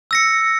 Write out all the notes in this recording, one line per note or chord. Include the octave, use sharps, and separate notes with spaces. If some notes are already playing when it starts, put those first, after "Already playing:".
E6 A#6 C#7